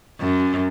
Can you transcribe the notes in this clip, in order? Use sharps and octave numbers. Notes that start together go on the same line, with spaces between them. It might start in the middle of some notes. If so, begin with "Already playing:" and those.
F#2